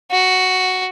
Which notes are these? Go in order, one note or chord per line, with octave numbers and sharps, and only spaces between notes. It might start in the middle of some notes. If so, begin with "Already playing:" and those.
F#4